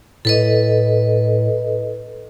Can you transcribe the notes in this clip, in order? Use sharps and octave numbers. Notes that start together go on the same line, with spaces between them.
A2 A4 B4 D#5